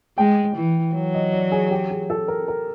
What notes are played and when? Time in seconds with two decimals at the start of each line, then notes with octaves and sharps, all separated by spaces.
0.18 G#3 G5
0.56 E3
0.95 F#3
1.14 D#5
1.33 D5
1.52 G#4
1.71 G4
1.90 G#4
2.10 A4
2.28 A#4
2.48 A#4